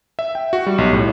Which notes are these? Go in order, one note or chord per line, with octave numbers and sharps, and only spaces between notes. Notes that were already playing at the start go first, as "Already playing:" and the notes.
E5
G5
F#4
G3
B1
A2